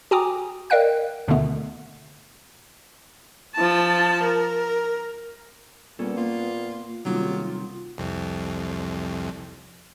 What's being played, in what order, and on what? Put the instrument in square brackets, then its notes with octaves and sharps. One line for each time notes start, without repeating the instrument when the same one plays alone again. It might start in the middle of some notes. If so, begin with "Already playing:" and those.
[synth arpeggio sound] F#4 G5 G#5 A#5 D6 D#6
A#4 D5 D#5 F5 G5 F#6
D2 B2 D3 D#3 A3 B3
[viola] F3 A5
A#4
[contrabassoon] A#2 [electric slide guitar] G3 C#4 A4 [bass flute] B3
[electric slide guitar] A#3 [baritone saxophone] F4
[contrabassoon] D#1 [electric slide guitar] C3 D#3 G3 [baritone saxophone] F#3 [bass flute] F4
[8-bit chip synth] C2 F2